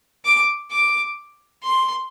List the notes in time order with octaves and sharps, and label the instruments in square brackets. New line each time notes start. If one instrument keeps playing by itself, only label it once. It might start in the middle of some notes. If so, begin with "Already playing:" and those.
[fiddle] D6
D6
C6